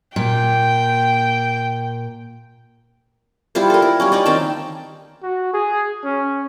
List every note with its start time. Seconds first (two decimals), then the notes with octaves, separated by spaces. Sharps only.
0.16 A#2 G5
3.55 G3 E4 F4 C5
3.70 A4 A#4
3.82 E4
4.00 G3 A#3 C#4
4.12 C#4 D#4 D5
4.26 D#3 C4 G5 A5
5.23 F#4
5.53 G#4
6.04 C#4